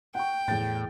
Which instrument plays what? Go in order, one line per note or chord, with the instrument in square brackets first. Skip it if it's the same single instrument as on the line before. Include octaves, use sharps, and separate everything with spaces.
[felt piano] F#5 C#6 [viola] G5
[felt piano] E2 A6 [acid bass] A2